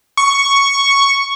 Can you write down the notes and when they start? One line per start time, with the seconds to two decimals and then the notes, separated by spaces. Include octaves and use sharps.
0.17 C#6